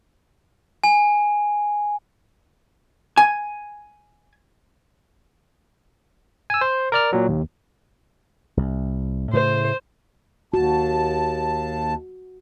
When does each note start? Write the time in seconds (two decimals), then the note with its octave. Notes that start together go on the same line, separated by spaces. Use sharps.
0.84 G#5
3.17 G#5
6.50 G#5 E6
6.61 C5
6.92 A#4 D5 F6
7.13 A#2 F#3
7.28 D#2
8.57 C2
9.33 A2 C#3 A3 C5
10.54 D#2 F#4 A5